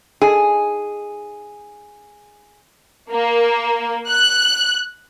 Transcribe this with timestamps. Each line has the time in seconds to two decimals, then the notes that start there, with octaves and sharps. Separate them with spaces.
0.22 D#4 G#4 D#5 G#5
3.10 A#3
4.10 F#6